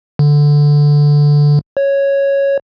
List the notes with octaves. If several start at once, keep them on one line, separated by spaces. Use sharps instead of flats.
D3
C#5